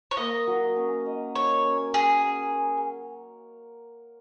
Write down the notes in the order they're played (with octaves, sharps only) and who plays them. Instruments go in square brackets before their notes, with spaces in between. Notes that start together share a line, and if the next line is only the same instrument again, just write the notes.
[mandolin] C#5
[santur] A#3 [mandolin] D#5
[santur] F#3
C#4
D#5
[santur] A#4 [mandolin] C#5
[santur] C#4
[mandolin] G#4 [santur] A#4
[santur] C#4
C#5